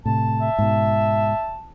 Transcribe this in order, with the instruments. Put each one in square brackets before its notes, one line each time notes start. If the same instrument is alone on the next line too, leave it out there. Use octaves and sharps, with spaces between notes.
[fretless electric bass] A2 C3 [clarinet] A5
[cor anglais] E5
[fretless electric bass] G#2 B2